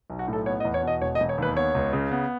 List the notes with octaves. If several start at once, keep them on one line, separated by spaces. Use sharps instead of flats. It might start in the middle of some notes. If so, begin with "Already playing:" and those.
B1
F#4
A2
A4
B3 C#5
D#5
E2
C#5
B2 D#5
E1 C#5
D#5
E1
C#5
D#2 B4
B3 C#5
C#2
C#3
B3